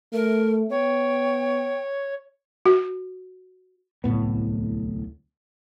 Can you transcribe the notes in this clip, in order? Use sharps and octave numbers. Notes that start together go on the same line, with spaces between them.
A3 A#4
B3 C#5 G5
F#4
D1 C2 A2 B3